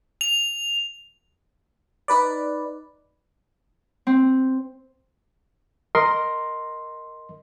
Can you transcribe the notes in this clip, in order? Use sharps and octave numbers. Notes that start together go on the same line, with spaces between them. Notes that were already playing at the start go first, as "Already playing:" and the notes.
F7
D#4 B4 D5
C4
A#4 D#5 C6